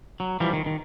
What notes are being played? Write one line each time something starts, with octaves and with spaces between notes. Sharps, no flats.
F#3
E3 F3 G3
D#3
D#3